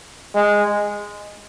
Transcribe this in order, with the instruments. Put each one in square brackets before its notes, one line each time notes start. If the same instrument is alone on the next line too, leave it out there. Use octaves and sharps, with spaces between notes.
[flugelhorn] G#3